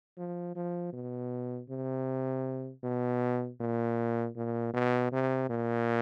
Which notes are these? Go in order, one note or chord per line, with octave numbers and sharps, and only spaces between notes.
F3
F3
B2
C3
B2
A#2
A#2
B2
C3
A#2